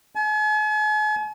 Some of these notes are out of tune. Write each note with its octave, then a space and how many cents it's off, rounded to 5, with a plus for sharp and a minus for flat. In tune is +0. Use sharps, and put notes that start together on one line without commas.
G#5 +45